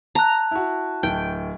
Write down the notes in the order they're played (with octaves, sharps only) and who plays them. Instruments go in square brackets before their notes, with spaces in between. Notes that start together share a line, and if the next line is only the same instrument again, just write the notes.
[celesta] A5 F#6 [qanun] A#5
[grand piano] E4 F#4
[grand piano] D1 [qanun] G5